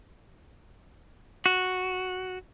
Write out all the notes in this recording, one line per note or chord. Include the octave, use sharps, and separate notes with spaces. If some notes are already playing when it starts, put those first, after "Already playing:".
F#4